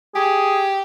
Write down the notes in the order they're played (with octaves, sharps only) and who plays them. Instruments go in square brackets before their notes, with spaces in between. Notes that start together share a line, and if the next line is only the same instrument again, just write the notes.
[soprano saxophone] G4 [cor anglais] G#4